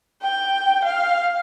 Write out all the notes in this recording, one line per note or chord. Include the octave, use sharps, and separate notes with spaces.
G5
F5